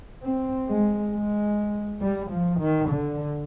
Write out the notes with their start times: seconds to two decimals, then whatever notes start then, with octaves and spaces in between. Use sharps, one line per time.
0.24 C4
0.68 G#3
1.12 G#3
2.00 G3
2.31 F3
2.59 D#3
2.89 D3